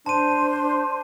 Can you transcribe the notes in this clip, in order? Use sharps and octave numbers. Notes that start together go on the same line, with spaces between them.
D4 C5 A5 C6 D#7